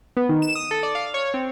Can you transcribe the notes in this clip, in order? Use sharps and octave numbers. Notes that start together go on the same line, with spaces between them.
B3
D#3
E7
D#6
A4
D5
F5
C#5
C4